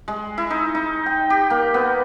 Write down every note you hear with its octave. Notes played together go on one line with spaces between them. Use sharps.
G#3
E4
D#4
D#4
G5
G4
A#3
B3